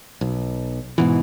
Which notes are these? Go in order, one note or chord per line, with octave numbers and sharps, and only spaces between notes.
B1
G#2 B2 E3